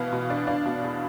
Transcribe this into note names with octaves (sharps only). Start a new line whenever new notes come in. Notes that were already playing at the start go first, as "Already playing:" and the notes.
Already playing: B2 E3 B3 F5
B2
D4
D4 F5
B2
E2